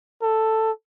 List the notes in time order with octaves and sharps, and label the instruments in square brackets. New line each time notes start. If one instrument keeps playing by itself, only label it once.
[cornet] A4